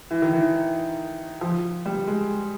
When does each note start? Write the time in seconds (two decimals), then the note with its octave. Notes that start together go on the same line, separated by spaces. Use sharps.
0.11 E3
0.22 D#3
0.33 E3
1.41 F3
1.86 G3
2.07 G#3